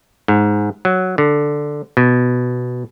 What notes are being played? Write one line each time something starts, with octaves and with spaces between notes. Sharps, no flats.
G#2
F#3
D3
B2